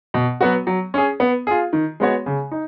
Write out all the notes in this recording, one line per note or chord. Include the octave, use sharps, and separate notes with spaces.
B2
F#3 B3 F#4
F#3
C#4 G#4
B3
F4 G#4
D#3
G#3 B3 F#4 C#5
C#3
D#4